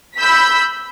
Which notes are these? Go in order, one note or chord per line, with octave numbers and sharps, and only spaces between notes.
B5 E6 G6 B6